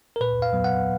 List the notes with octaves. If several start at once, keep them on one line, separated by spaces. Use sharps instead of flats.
A#4
A#2 B4
F5
F#3 B3
F#5